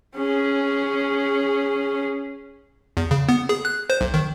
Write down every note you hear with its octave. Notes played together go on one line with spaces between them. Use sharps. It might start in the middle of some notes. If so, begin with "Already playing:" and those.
C#4 G#4
E2
C#3
B3
G#4
F#6
C5
B1
D#3